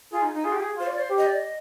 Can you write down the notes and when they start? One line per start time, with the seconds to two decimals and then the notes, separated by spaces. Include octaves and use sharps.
0.12 F4 G#4
0.22 D#4
0.34 D#4
0.44 F4 G#4
0.53 G4
0.61 G#4
0.77 F4 C5
0.88 D5
0.99 C5
1.09 G4
1.18 D#5
1.26 D5
1.35 D#5